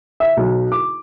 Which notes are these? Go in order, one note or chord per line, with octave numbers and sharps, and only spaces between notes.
E5
B1
D6